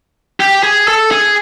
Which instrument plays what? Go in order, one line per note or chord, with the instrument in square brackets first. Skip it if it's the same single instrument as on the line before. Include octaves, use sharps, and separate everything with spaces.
[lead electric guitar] G4
G#4
A4
G#4